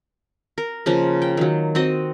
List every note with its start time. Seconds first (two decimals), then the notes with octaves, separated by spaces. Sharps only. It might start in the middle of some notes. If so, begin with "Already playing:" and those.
0.58 A#4
0.86 C#3 F3 A#3
1.22 G5
1.37 D#3 F#3
1.75 C4 F#4 D#5